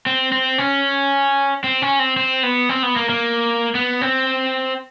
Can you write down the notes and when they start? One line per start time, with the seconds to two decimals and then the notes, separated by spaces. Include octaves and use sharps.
0.06 C4
0.32 C4
0.58 C#4
1.64 C4
1.82 C#4
1.99 C4
2.17 C4
2.43 B3
2.69 C4
2.83 B3
2.96 A#3
3.10 A#3
3.75 B3
4.01 C4